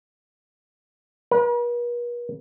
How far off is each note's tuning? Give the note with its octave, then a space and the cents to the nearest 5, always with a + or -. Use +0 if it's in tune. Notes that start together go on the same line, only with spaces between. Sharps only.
B4 -45